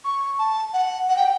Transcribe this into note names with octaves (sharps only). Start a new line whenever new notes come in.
C#6
A5
F#5
F#5
G5